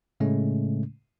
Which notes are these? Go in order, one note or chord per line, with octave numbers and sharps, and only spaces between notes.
A2 C#3 G#3 A3 C#4